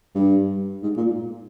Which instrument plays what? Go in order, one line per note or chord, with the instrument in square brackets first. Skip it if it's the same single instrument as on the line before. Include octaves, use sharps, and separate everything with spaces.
[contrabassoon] G2
G#2
A#2